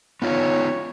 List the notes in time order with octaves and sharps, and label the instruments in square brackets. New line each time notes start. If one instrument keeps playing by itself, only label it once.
[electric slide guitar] B3 D#4 F4 [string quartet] C#5